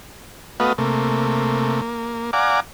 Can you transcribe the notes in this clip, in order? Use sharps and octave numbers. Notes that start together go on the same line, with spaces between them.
A3 B3 F#4 B4 D#5 F5
C3 A3 A#3
A#3
D5 F5 F#5 G#5 A#5 D6